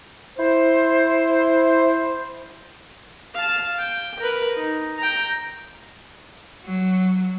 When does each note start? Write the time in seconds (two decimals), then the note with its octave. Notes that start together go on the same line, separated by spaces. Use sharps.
0.38 E4 C5
3.35 F5 A5
3.78 G5
4.20 A#4 B4
4.57 D#4
4.98 G5 A#5
6.65 F#3